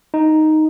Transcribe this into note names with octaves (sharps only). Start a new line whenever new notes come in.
D#4